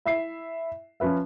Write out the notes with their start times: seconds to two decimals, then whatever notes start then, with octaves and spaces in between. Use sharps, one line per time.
0.05 E4 E5 C7
1.00 F3 C#4 F4 B4 E5